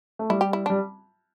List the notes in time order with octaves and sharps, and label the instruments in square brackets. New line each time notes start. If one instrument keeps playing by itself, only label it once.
[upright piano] A3
[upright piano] G3 [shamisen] E4
[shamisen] G4
E4
[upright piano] G3 [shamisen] D4